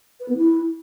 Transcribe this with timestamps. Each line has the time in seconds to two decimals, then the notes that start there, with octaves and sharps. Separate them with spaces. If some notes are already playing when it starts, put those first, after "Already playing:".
0.20 B4
0.29 B3
0.37 E4